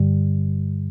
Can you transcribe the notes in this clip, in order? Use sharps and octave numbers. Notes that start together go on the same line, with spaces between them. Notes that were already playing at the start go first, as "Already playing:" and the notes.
Already playing: G2 D3 G3